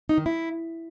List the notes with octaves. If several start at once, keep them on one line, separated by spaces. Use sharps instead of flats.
D#4
D#3
E4